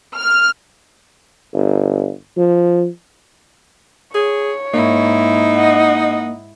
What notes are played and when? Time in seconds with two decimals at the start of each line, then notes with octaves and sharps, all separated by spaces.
0.15 F6
1.54 G1
2.36 F3
4.15 G#4 C#5
4.74 G#2 A#3 D#4 E4
5.55 D#5 F#5